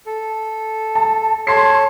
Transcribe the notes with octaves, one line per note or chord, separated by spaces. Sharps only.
A4
A5
A4 C#5 A5 C6 C7